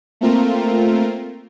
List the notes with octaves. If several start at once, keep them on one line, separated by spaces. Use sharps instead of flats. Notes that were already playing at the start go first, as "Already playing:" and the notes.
A3 A#3 C4 F4 A#4